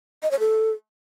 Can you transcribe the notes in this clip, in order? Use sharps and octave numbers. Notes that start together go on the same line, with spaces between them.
D#5
C#5
A4